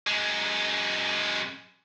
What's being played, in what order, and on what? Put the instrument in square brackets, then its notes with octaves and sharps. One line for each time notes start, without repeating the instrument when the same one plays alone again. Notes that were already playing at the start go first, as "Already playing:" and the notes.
[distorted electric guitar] F#2 G#3